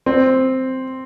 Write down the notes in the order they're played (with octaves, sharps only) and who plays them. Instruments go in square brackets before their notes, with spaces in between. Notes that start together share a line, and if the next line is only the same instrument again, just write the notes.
[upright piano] C4